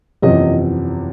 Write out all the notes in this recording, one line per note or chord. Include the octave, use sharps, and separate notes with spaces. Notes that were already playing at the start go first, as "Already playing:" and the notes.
F#1 E2 C3 F3 D#5